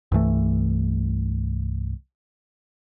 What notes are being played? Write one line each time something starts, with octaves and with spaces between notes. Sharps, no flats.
C2 G2 E3 A3